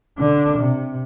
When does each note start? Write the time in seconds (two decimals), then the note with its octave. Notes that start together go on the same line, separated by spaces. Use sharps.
0.18 D3 D4
0.57 C3